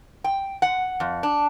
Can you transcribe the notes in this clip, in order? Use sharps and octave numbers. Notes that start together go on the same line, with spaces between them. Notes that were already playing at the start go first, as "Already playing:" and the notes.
G5
F#5
F2
D4